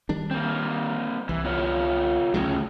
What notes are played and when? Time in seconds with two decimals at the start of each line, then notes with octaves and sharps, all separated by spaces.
0.09 D#3 G3 D4
0.31 A#3 C4
1.29 C2 E3
1.44 B3 F4 C#5
2.34 D2 C#3 F#3 A3 C#4